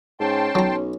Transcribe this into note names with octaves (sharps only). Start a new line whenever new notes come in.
G#2 C#4 G5 A5 C6
B1 F#3 A#5